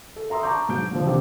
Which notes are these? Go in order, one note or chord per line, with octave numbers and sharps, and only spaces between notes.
A4
E5 A#5 C6 D#6 E6
A5 A#5 C#6 D6 G6
G#2 F#3 G6 D7
A#2 D3 F3
C3 D#3 D6